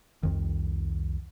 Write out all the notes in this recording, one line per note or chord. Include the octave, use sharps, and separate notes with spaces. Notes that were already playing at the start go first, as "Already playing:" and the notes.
C2 F2 D#3